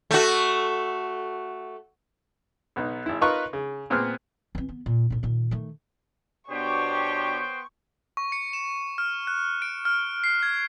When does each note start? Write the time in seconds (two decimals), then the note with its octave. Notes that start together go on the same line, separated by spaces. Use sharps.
0.11 A3 F#4
2.76 B1 B3 D#4
3.06 G#1 E4
3.21 D#4 F4 A#4 B4 A#5 C#6
3.53 C#3
3.90 A#2 B3 C4 G#4 F6
4.55 E3 C4
4.69 B3
4.86 A#2
5.10 C#2 A2
5.23 A#2 D#3
5.51 D#3 A3
6.50 B2 B3 D4 G4 C5 C#5 G5 C#6
8.17 C#6
8.32 C#7
8.53 E7
8.98 F6
9.27 F#6
9.62 D7
9.85 F6
10.24 C7
10.43 G#6